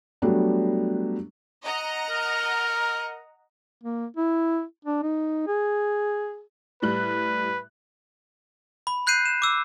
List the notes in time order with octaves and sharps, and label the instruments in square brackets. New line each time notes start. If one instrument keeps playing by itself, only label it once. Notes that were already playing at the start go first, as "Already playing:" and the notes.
[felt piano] F#3 G3 A3 B3 D4
[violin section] D#5 F#5 A#5
[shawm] A#4
[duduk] A#3
E4
D4
D#4
G#4
[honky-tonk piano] A2 G3 F#6 [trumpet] B4
[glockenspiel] B5
B5 F#6 G6 C7 D#7
E7
D6 E6